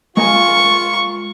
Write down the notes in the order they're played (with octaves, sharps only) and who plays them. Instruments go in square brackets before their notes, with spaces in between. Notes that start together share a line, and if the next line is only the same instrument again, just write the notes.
[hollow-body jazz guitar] G#3 A#4 G#5 [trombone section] F4 [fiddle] C#6